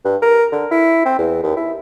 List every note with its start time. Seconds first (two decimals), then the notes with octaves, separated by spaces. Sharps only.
0.05 G2
0.22 A#4
0.52 D3
0.71 E4
1.05 C4
1.18 E2
1.43 D#2
1.56 E4